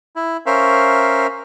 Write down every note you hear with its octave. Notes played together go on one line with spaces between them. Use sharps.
E4
C#4 A#4 C5 E5 F5